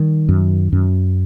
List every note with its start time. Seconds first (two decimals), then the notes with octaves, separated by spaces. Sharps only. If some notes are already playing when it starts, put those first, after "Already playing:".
Already playing: D#3 G3
0.29 F#2
0.72 F#2